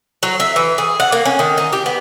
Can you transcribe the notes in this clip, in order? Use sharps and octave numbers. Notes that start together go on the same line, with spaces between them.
F#3
E5
E3
G#4
F#5
A#3
C#4
D#3
D#4
G4
B3